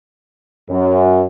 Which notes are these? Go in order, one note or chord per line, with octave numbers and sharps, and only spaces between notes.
F#2